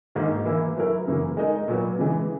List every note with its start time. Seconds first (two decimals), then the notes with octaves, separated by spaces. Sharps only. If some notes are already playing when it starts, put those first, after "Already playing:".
0.15 G#2 D#3 A#3 D#4
0.45 E3 A#3 E4
0.77 F#3 B3 E4 A#4
1.07 F#2 C#3 E3 A#3
1.37 G#3 D#4 A#4 D#5
1.68 A#2 F#3 B3
1.99 C#3 E3 G#3